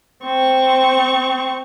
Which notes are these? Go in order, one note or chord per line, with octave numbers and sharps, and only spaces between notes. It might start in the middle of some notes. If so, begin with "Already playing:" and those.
C4 C#6